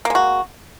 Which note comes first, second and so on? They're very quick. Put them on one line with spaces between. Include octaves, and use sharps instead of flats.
A#3 G#3 F#4